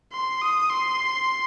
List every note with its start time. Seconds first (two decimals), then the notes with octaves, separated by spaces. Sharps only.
0.12 C6
0.41 D#6
0.69 C6